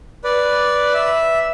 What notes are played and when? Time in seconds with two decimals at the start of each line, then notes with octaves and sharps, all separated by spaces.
0.24 B4 D5
0.94 E5